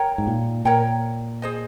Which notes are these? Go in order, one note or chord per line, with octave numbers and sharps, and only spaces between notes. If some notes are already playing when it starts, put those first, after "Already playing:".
Already playing: A#4 C#5 G5 A#5
G#2
A#2
A#2 A#4 C#5 G5 A#5
G#4 C5 D#5